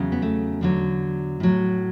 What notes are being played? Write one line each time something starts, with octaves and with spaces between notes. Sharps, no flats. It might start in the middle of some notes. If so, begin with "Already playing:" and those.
Already playing: E2 C#3 F#3
B3
A3
E2 D3 F#3
A2 F#3